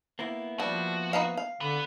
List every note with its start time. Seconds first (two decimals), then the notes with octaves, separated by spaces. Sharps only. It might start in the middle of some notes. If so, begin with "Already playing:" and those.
0.19 A#3 B3 E4
0.59 F3 G3 D4 F#4
1.13 D#4 B4 F5
1.37 F5
1.61 D3 B3